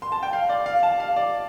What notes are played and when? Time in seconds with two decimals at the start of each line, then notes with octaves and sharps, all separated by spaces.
0.02 C6
0.12 A5
0.23 G5
0.33 F5
0.49 D5
0.66 F5
0.83 A5
1.00 F5
1.16 D5